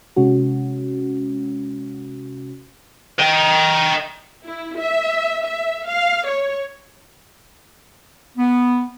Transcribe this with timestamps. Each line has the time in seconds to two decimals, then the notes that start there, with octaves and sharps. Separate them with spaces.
0.16 C3 G#3 C#4 F#4
3.19 D#5 G5
4.47 E4
4.79 E5
5.44 E5
5.88 F5
6.28 C#5
8.37 B3